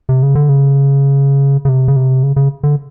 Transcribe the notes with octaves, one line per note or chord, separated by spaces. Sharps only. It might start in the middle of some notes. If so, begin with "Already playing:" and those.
C3
C#3
D3
C#3
C#3
C3
C#3
C3
C#3
C#3
D3